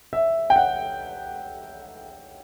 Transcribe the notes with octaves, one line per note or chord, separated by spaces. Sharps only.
E5
G5
F#5